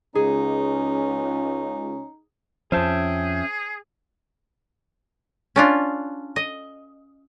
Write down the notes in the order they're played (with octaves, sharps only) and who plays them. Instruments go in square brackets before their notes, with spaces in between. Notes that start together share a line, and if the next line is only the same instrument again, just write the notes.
[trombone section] C#2 [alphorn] C#4 [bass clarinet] D#4 [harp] G#4
[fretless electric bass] F2 F3 [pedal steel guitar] C#4 E5 G5 [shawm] G#4 [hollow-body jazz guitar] C5 A5
[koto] C#4 D4 F4
D#5